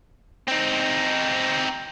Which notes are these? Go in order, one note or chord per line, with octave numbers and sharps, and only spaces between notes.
C4 D#4